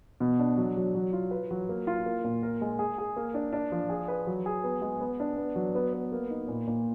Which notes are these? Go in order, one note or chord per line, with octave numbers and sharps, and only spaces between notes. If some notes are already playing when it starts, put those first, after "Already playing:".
B2
D4
F#3
F#3
F#3
F4
B4
F#3
A#3
F4
A#3
A#2
A#4
G#3
G#4
G#4
A#3
D4
D4
F3
G#4
B4
F#3
G#4
B3
G#3
B3
D4
B3
F#3
B3
B3
A#3
D#4
A#2
A#2